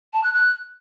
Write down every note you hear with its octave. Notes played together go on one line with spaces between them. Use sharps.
A5
F#6
F#6